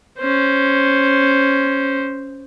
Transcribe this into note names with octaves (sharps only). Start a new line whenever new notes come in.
C#4 C5